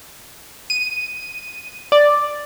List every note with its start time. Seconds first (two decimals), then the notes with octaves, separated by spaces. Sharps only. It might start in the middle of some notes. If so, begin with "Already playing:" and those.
0.70 D#7
1.92 D5